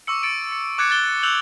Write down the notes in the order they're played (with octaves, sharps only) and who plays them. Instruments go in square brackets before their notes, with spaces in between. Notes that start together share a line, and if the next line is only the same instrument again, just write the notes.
[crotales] C#6 D6 E6 C#7
A6 C#7 D7
C#7
D6 F#6 G#6 A6 C#7
F#6 A6 G7
E6 F#6 G6 F7 F#7